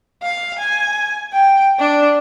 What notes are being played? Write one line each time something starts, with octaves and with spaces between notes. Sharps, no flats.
F5
G#5
G5
D4